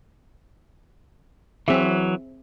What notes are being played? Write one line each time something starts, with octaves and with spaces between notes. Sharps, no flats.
E3 F#3 C4 G#4 E5